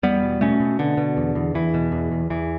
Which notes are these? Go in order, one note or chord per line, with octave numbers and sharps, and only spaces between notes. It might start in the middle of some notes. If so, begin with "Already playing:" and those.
E2 G3 B3
B2
B2 A3 C#4
B2
B2 D3
B2
E2
E2
E2 E3
B2
E2
E2
E2 E3